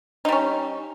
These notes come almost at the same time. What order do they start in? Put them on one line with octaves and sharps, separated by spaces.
D#4 G3 C#4